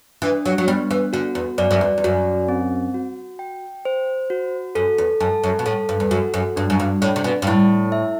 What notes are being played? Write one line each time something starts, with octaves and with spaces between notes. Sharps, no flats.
E3 D4
F#3
F#3
G3 B3
E3
D3 F#4
E2
F#2 D5
F#2
E2
E2
F#2 F#4
C4
F#4
G5
C5
F#4
F#2 A4
E2
F#2 A5
F#2
B2
A2 A4
G2
E2
F#2 F#4
F#2
G2 D4
F#2
G2
A2 D5
C3
B2
G2
A2 E4
E5